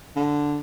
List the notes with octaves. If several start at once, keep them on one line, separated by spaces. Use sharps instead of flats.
D3